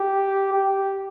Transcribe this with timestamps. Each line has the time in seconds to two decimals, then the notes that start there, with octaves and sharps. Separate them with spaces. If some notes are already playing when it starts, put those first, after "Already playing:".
Already playing: G4
0.53 G4